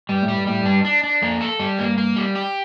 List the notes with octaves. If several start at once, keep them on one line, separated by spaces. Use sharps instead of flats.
G2 G3
A2
G3
G2
A2 G3
G2 D4
D4
D4
F2 A#3
A4
G3
G2 A#3
A#3
G3
G4